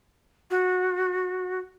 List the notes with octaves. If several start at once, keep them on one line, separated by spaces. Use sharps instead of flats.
F#4